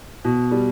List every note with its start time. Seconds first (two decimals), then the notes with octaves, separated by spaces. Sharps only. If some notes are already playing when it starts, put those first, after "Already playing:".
0.25 B2
0.51 G3